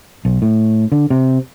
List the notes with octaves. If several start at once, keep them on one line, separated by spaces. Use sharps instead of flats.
B1
A2
D3
C3